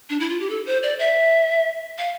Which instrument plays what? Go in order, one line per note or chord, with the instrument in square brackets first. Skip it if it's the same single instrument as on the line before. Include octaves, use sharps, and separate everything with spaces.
[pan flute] D4
E4
F4
G4
A4
C5
D5
E5
F5